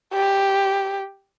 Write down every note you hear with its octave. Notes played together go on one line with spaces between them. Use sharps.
G4